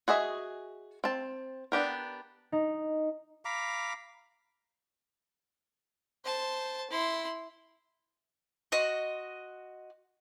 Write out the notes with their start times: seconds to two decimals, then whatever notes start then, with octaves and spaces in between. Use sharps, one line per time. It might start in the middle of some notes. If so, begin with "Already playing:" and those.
0.08 F#4 G#4 D#5 E5
1.04 C4 A5
1.72 B3 D4 G4 A#4
2.52 D#4
3.45 F5 A#5 B5 D6
6.25 C5 A5
6.90 E4 C6
8.72 F#4 D#5 C6